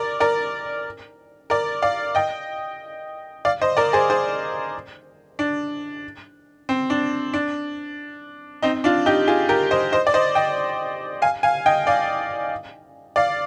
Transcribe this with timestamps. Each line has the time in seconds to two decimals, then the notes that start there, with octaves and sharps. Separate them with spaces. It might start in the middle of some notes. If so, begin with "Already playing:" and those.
Already playing: A#4 D5
0.20 A#4 D5
1.50 A#4 D5
1.82 D5 F5
2.15 D#5 G5
3.45 D5 F5
3.61 C5 D#5
3.77 A#4 D5
3.93 G#4 C5
4.10 G#4 C5
5.39 D4
6.69 C4
6.90 D4
7.33 D4
8.63 C4 D#4
8.84 D4 F4
9.06 D#4 G4
9.27 F4 G#4
9.49 G4 A#4
9.71 C5 D#5
9.92 C5 D#5
10.07 D5
10.14 C5 D#5
10.35 D#5 G5
11.22 F5 G#5
11.43 F5 G#5
11.66 D#5 G5
11.87 D5 F5
13.16 D5 F5